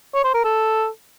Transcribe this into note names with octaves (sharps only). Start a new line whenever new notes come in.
C#5
C5
A#4
A4